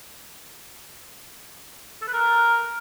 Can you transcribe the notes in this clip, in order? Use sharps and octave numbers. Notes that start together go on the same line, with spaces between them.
A4
B4
A#4